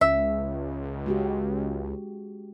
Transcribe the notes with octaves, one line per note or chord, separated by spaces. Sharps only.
C#2 C#4 E5
G#3 F#4 G4